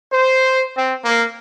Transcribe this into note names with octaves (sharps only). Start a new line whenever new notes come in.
C5
C4
A#3